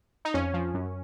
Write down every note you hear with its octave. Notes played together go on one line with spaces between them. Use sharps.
D#4
F2 C#4
F3
F#2